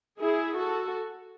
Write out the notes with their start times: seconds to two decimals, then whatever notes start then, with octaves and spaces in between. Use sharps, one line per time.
0.19 E4 G#4
0.55 F#4 A4